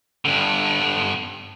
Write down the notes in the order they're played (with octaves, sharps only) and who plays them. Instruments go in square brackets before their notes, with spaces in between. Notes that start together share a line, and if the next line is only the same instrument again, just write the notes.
[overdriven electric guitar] G2 D3